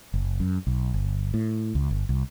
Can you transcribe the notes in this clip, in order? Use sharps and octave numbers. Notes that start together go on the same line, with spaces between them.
F#1
F#2
B1
G1
A2
C#2
G1
C2